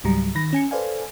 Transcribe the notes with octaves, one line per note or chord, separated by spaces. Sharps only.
C#2 G#2 F#3 G3 A#5
D#3 B5 A#6
C#4 G#5 C#7
A4 B4 C5 D5 F5 G#5